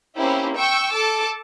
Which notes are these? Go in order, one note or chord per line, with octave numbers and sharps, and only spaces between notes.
A#3 C4 C#4 E4 G4
G5 C#6 E6
A4 A5 D6